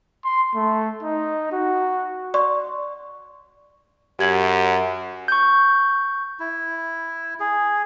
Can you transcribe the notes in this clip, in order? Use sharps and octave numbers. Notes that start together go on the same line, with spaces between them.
C6
A3
D#4
F#4
D5 C6 C#6
F#2 G4 G#6 F#7
C#6 G6
E4
G#4